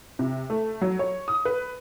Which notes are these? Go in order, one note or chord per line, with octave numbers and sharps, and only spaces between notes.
C3
A3
F#3
C#5
D#6
B4